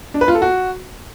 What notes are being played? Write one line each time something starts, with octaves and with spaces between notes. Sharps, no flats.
D4
B4
F4
A4
F#4